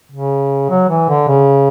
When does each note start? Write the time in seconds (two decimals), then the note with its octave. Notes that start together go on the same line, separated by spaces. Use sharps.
0.12 C#3
0.70 F#3
0.89 E3
1.09 D3
1.28 C#3